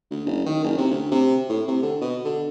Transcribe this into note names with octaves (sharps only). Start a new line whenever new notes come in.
D2
F#1
D#3
F#1
C3
D2
C3
A2
C3
D3
B2
D3